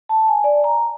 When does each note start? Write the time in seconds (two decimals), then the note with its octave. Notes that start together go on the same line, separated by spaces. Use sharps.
0.09 A5
0.28 G#5
0.44 D5
0.64 A#5